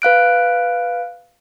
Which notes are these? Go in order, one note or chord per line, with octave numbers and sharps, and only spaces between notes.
B4 F5 F#6 D7